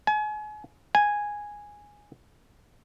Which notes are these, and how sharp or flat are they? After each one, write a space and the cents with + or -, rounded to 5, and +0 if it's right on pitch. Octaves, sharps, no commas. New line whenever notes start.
G#5 +35
G#5 -5